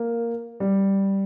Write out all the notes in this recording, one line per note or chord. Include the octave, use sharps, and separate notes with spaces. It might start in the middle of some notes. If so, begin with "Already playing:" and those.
Already playing: A#3
G3